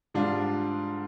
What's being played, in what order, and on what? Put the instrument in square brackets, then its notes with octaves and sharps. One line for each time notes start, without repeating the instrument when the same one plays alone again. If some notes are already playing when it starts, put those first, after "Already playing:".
[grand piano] G#2 G3 D4 F4